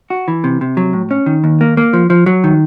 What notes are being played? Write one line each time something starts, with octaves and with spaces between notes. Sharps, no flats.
F#4
E3
C3
C3
F#3
A2
C#4
D#3
D#2
A#3
A#3
F3
F3
F#3
D#3